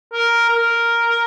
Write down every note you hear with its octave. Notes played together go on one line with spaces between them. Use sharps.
A#4
A#4